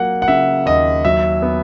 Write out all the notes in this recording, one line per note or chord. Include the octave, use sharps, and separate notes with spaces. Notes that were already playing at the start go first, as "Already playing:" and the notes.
Already playing: F#3 A#3 F#5
F#5
C#3 E5
D#2 D#5
F#3 E5
B3